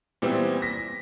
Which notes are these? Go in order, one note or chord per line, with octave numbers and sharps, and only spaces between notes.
A#2 E3 G3 B3 C4
A#6 B6